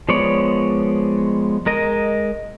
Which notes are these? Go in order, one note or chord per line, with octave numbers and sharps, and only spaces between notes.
F3 G#3 B3 C#5 D5
G#3 A#4 D#5